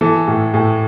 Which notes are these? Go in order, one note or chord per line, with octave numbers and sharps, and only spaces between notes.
E3 A4
A2
A2